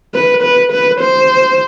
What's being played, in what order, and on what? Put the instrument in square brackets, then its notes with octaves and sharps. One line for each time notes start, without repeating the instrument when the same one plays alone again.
[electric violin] B4
B4
B4
C5